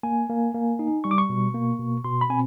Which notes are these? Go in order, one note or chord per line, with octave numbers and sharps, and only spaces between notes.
A#3 G#5
A#3
A#3
D#4
G3 C#6
D6
C#6
B2
A#3
B2
B2 C6
B5
C4 G#5